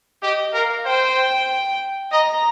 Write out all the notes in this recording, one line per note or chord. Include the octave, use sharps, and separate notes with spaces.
G4 D#5
A#4 F5
C5 G5
D#5 A#5